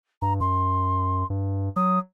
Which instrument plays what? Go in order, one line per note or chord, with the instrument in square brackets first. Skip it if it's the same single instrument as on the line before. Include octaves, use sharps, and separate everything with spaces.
[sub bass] G2 [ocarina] A#5
[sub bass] F#2 [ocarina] C6
[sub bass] G2
[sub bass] F#3 [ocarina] D#6